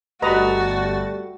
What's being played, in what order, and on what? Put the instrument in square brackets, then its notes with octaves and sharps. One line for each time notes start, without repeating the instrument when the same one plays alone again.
[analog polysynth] G1 A6 [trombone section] G3 A3 [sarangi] F#4 [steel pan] B4 D#5 A#5